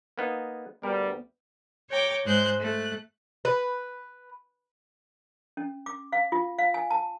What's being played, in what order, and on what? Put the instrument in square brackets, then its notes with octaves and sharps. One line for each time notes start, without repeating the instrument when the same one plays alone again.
[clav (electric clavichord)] A#3 B3 D#4
[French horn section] D2 B3 [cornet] G3 [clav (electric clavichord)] A#4
[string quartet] C#5 G5 A#5 D6
G#2 G#3 C5 F#6 G6
A3 F#6
[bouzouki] B4
[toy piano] C#4
D6
F5
F4
F5
G#5
A5